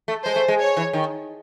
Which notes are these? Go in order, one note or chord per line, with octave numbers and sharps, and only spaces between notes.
A3
G#3 C5
A3
G#3
C#5
E3
D#3